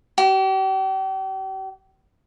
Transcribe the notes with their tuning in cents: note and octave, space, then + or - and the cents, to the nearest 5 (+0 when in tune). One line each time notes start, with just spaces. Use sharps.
G4 -40